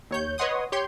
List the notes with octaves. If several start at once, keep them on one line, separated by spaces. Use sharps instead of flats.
D#2 C#5 G6
B4 C#5 D#5 F#5 C6 D#6
G4 C#5 C6 G6